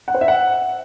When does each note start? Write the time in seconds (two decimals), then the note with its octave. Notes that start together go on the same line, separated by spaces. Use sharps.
0.08 F#5
0.14 C5
0.21 E5
0.28 F#5